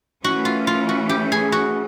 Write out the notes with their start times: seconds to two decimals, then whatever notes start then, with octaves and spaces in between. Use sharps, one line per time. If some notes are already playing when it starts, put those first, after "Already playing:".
0.23 E3 A3 C#4 F#4
0.45 F4
0.67 F4
0.89 F#4
1.09 G4
1.32 G#4
1.52 F#4